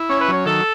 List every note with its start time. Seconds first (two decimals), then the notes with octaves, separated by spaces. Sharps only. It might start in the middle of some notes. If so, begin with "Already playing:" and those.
Already playing: E4
0.09 C#4 C#5
0.21 B4
0.28 F#3 C#5
0.46 D#3 A4